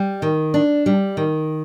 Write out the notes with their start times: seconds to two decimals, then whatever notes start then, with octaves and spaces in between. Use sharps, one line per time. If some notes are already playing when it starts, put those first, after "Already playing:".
Already playing: G3
0.22 D#3
0.54 D4
0.86 G3
1.17 D#3